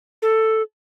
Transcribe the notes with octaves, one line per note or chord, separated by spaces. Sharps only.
A4